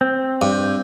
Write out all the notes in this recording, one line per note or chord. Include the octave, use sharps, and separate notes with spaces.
C4
G2